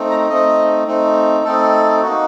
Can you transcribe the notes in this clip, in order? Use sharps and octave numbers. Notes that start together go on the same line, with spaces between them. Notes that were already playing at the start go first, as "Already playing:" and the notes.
Already playing: A3 C4 D#4
A#5
A3 C4 D#4 D#5
A3 C4 D#4
A3 C4 D#4 A4
A#3 D#4 F#4